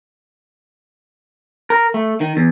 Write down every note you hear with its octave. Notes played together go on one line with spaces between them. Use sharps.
A#4
A3
D#3
E2